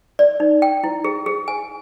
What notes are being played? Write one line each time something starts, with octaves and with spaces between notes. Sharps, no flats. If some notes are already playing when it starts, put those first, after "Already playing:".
D5
D#4
G5
E4
G#4
G#4
G#5